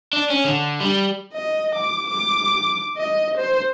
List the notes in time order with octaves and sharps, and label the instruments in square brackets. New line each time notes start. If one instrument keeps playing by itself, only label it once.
[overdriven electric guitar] D4
C#4
D3
G3
[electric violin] D#5
D6
D6
D#5
C5